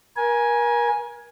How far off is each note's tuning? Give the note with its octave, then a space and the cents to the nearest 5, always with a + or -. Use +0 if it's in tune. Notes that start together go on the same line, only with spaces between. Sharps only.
A#4 +35 G#5 +0